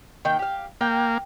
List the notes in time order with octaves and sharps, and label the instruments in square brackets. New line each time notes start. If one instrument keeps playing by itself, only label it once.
[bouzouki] D#3 A#3 G5
G4 F5
[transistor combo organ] A#3 [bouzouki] G5